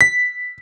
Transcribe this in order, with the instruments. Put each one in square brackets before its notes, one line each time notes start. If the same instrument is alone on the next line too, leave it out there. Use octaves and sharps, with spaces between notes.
[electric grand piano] B6